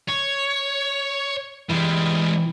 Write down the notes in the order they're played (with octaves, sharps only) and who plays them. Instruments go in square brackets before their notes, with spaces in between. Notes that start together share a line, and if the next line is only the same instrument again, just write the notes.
[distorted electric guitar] C#5
[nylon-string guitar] C3 E3 [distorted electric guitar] G3 G#3